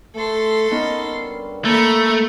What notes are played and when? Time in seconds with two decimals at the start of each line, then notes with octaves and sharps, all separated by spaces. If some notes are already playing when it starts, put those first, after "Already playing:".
0.16 A3 A4 C6
0.71 B3 C#4 D#4 A#4
1.10 G2
1.65 A3 A#3 A#5 B5